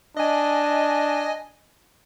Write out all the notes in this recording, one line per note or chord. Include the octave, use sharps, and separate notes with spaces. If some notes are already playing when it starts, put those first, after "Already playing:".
D4 D#5 G#5